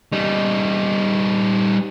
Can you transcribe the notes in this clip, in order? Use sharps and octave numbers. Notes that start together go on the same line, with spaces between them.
G3 D#4